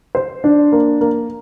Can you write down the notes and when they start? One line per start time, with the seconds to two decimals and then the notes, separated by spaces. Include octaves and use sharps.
0.15 C5
0.44 D4
0.72 A#3
1.01 A#3